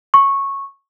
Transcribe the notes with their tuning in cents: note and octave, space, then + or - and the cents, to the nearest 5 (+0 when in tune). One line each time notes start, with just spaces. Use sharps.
C#6 -10